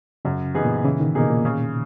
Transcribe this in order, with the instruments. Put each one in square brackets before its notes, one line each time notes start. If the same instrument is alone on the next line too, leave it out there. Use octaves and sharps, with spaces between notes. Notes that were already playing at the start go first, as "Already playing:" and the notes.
[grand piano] F#2 [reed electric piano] C#3
[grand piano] E3 B3 D#4 G#4
[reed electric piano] A#2
[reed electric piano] C#3 [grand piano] E3
[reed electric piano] D#3
[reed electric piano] B2 [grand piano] A#3 D#4 G#4
[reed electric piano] A#2
[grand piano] C#3